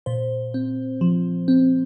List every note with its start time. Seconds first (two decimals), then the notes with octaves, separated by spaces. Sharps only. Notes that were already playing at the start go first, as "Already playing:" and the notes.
0.06 A#2 C5
0.54 C4
1.01 F3
1.48 C4